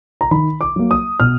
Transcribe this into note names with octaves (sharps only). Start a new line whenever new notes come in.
A#5
D#3 B5
D6
F#3 A#3
D#6
B2 F6